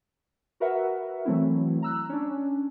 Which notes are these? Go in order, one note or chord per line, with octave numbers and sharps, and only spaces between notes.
F#4 A#4 B4 E5 F#5
E3 F#3 A3 C4 E4
A#5 E6 F#6
C#4 D4